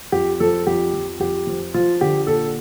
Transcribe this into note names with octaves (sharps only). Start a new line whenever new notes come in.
F2 G4
F3 A4
F2 G4
F2
F2 G4
F3
F3 F4
D3 G4
A#2 A4